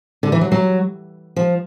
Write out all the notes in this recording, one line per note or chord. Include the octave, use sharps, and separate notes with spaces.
D3
E3
F#3
F#3
F3